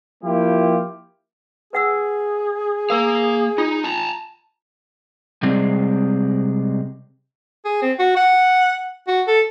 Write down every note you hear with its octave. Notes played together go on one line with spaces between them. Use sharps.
F3 A#3 E4 F4 G4
G#4 B4 F#5 E6
A#3 A#4 F5
D#4 F4
A5 A#5
C3 G3 G#3 C4
G#4
C4
F#4
F#5
F#4
A4